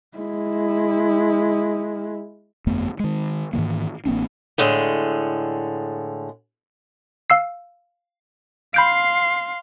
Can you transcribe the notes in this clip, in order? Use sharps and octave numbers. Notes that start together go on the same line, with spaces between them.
G#3 E4
G1 F2 A3 B3
D#3 G#3
G#2 D#3 E3 A#3
A1 A#3 C4 D4
A2 D3 G#3
F5 E6 C7
F5 B5 C6 G6 D7